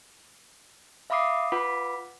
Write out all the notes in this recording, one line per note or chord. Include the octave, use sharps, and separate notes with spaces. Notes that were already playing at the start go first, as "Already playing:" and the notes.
E5 F5 B5 D6 D#6 C7
F4 B4 F#5 B5 D6 B6